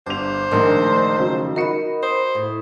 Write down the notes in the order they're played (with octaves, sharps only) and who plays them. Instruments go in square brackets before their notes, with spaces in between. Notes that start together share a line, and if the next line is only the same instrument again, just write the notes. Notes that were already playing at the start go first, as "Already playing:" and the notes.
[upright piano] G1 G2 F7 [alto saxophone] C5 [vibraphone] D6
[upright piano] A#1 D4 [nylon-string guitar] D#3 G#3 [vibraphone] A3 A#5 C6
[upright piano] F2 C#3 F#3
[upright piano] D#4 F#4 C#7 [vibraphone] A#4 D#5 B5
[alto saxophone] C5 [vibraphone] D#6
[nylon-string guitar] A2